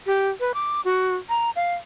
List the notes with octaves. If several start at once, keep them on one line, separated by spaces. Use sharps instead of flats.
G4
B4
D6
F#4
A#5
F5